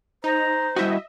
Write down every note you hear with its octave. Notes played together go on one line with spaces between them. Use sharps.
D#4 C5 A#5
G3 E4 F#4 D#5 E5